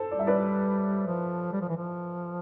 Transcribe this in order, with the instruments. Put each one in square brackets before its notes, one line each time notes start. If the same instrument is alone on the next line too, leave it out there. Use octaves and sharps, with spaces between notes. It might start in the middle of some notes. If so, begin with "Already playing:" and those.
Already playing: [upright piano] A4 C5
[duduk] G3 [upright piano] D5
[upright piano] E5
B4 D5
[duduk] F3
G3
F3
E3
F3